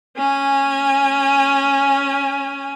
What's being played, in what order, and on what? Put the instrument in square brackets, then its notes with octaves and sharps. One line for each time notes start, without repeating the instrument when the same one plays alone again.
[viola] C#4 G#5